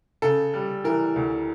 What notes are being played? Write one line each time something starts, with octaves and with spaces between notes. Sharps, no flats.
C#3 A4
G3
E3 A#4
D2